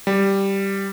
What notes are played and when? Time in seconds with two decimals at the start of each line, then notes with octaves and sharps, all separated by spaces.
0.07 G3